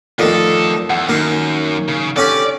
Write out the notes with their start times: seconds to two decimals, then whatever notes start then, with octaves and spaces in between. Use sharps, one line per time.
0.19 F2 D3 D#3 F3 A3 A4
0.90 E2 F#5 E6
1.09 F#2 D#3 A#3
1.88 C#3
2.17 D3 C#4 G4 D5